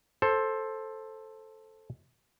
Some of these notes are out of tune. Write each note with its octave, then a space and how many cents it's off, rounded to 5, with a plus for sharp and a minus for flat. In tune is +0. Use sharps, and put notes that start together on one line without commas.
A4 +0 C5 +15